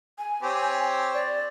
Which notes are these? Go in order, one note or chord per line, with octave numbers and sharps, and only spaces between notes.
G#5
C4 G4 C#5
D5